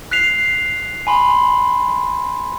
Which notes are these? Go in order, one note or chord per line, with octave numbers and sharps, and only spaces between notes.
F#6 B6 C7 F7
G#5 B5 C6